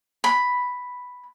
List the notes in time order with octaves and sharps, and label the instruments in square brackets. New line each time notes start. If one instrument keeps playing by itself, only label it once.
[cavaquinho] B5